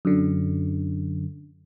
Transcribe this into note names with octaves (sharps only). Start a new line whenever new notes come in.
F#2 D3